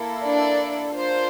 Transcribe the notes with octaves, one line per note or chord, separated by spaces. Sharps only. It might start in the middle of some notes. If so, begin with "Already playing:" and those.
Already playing: A#3 E4 A4
D4 D5
A#3 D4 F4 C5